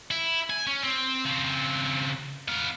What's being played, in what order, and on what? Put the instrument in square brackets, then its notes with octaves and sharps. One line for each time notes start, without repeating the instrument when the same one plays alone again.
[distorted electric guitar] E4
G#5
C#4
C4
C#3 C4
B3 F5